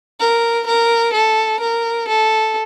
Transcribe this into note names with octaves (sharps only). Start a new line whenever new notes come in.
A#4
A#4
A4
A#4
A4